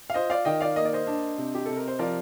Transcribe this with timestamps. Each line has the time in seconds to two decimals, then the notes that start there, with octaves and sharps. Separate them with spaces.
0.10 F5
0.14 F4 C5 D#5
0.30 D5 F5
0.45 D#3 D#5 G5
0.60 D5 F5
0.76 A#3 D#5
0.85 D5
0.93 C5 D#5
1.07 D4
1.38 C3
1.55 G4
1.66 C3 A4
1.77 A#4
1.88 C5
1.99 F3 A#4 D5